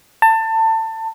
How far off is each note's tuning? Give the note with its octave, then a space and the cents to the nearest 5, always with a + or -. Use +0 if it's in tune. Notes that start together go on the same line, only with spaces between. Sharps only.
A5 +25